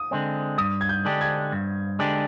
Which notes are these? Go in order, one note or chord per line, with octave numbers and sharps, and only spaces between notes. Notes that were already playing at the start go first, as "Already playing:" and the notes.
Already playing: D#6
D3 G#3 C4
G2 D#6
G#6
G6
D3 G#3 D4 G4
G#6
G2
D3 G#3 D4 G4